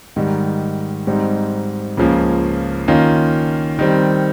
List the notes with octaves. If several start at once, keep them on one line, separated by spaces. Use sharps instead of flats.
G#2 D#3 G3
G#2 G3 C4 D#4
C#2 C#3 F3 A#3 C#4
D#3 A#3 C#4 F4
D#3 G3 C4